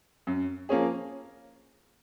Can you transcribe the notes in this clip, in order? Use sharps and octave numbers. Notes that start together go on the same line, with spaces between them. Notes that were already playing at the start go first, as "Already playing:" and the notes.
F#2
F3 A#3 C#4 G#4